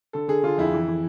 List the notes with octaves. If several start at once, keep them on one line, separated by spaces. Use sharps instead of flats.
D3 A4
D3 G#4
D3 F4
F2 E4
E3
E3